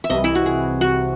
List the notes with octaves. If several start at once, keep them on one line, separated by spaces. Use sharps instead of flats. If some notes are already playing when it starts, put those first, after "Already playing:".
E5
C2 C3 E3 D#5
E4
F#4
G#4
F#4